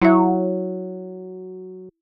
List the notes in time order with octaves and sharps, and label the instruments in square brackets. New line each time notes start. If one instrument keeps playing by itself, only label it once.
[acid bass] F#3 [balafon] E4 E5